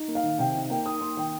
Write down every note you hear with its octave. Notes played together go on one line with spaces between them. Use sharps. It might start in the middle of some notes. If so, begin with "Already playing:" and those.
Already playing: D#4
A#3
F5
D#3
C3 G5
D#4
A#3 G5
D#4 D#6
A#3 C6
D#3 G5